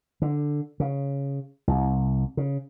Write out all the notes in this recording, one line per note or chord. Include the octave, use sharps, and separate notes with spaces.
D3
C#3
C2
C#3